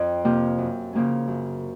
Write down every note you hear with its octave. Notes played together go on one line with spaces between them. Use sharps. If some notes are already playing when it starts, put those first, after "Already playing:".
Already playing: F2
C3 F3 A#3
F#2
C#3 F3 A#3 C#4
F#2